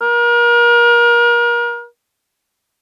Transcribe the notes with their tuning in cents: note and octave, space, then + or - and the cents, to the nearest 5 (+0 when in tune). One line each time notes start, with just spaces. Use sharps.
A#4 +35